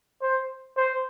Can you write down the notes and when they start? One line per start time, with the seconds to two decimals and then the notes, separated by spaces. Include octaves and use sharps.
0.22 C5
0.77 C5